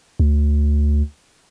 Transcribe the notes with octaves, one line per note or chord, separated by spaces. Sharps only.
D2